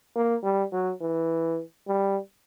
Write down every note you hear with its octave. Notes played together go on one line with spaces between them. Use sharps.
A#3
G3
F#3
E3
G3